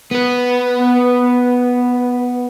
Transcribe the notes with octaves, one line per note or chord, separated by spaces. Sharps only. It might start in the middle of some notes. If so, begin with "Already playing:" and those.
B3 B4